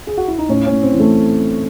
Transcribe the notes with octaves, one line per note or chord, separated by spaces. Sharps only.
G#4
F#4
E4
D#4
A2 C#4
C#4
A2
C4
E3
A3